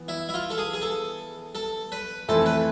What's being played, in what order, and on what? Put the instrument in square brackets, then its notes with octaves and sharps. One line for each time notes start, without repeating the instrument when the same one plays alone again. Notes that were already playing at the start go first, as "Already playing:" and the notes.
Already playing: [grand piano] E3 B3
[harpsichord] E4
E4
F4
A4
G#4
G#4
A4
A4
B4
[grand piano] F2 E3 A3 C4 E4 [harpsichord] A4
[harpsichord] B4